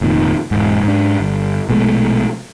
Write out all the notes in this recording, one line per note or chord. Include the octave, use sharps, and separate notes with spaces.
F1 F2 A#2 D#3
E1 G#2
G#2 D4
G1
A#1 B2 G#3 A3